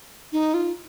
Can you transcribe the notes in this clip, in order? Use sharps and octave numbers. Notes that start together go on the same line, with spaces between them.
D#4
F4